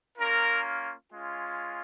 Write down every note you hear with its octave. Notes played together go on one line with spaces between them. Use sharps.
A#3 C#4 F4 A#4
G#3 C#4 F4